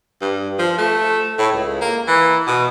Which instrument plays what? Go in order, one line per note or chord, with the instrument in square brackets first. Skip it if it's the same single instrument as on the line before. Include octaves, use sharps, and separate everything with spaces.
[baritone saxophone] G2
F3
A3
A2
C#2
A#3
E3
B2